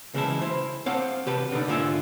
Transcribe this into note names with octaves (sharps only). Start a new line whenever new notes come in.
C2 C#3 E3 G#3 E4 A5
E4 C5
C4 C#5 F5 F#5 A5
C2 C3 G4 B4 A5
B2 D3 D4 D#4
G#2 D3 F4 G#4 E5 G#5